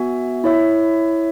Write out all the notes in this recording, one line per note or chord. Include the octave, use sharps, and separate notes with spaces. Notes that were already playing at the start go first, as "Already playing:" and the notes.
Already playing: B3 F#4 E5 G#5
E4 C#5 E5